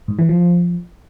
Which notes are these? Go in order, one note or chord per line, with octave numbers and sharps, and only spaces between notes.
G#2
E3
F3